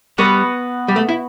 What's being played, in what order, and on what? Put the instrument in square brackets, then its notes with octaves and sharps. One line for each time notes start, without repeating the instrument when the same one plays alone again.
[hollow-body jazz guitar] G3 [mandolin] B3 F#4 B4
[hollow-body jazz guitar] G3
A3
E4